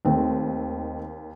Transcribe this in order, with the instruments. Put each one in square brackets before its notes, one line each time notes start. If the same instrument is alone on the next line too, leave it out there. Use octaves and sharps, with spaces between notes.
[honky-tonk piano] D#2 [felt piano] D#3 A3 C4